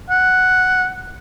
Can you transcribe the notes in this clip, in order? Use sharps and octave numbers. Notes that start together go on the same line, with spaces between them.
F#5